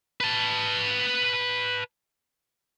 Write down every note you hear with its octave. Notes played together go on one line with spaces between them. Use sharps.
B4 A5